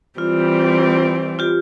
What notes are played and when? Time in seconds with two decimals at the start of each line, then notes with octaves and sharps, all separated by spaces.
0.18 E3 G3 C4 F4
1.39 F4 G4